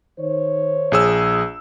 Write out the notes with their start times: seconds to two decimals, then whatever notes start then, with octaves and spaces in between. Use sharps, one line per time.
0.19 D#3 C5 C#5
0.92 A#1 G#4 E6